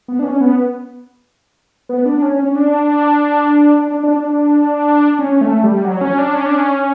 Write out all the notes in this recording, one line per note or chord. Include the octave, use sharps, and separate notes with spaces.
B3
D4
C#4
B3
B3
D4
C#4
C#4
D4
D4
D4
D4
C#4
A3
G3
F#3
C#4
D4
C#4
D4
C#4